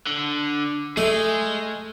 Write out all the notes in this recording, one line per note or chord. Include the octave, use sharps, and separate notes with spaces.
D3
A3 G#4 D#5